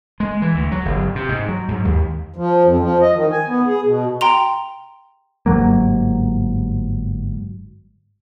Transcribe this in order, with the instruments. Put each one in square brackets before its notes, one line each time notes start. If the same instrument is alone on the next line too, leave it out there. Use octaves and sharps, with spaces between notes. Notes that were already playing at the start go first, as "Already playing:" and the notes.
[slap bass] G#3
E3
D2
F#3
G1
C3
G#2
F#3
G#2
D#2
[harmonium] F3
F2
F3
D#5
D#3
G#5
B3
G#4
B2
[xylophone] G5 A#5 C6 F7
[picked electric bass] G1 G#2 F#3 A#3